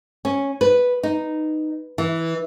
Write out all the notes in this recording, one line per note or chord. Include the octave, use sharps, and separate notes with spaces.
C#4
B4
D#4
E3